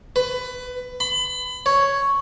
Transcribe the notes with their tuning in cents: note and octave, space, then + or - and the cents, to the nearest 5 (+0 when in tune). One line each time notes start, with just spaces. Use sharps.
B4 +20
B5 +30
C#5 +0